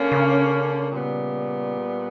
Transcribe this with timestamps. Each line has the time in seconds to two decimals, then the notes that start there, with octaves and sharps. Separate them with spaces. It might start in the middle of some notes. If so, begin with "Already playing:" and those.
Already playing: D3 A#3 C#4
0.12 C#3
0.90 A#2 G3 B3